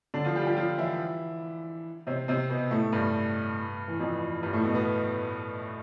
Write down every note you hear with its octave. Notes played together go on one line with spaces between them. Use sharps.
D3 D4
F3 F4
G3 G4
F4
G3 G4
F3 F4
E3 E4
C3 C4
C3 C4
B2 B3
A2 A3
G2 G3
E3
F2 F3
G2 G3
A2 A3
B2 B3
B2 B3